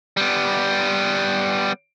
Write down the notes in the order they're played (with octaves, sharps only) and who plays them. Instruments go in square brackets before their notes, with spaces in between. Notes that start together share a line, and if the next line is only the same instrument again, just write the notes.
[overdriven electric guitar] G3 B3